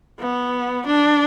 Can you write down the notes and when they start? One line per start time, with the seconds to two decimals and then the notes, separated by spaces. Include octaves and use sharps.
0.19 B3
0.87 D4